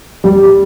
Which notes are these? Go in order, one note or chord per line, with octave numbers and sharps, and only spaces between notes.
G3